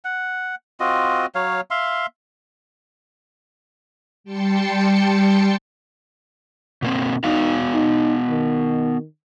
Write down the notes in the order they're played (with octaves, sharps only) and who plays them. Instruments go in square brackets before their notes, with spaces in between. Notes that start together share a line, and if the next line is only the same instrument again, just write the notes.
[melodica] F#5
C4 F4 F#4 D#5
F#3 C#5 F5
E5 F5 C6
[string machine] G3 G5 A5 C6 C#7
[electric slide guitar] B2 A#3 C4
[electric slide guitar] B3 F#4 F5 [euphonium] D#4
[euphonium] D#4
D#3